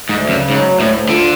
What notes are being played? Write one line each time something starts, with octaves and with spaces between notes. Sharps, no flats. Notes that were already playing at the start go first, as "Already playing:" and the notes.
D2 G#2
F#2 C#3
G#2 F#3
D2
A2
D2
D3 F4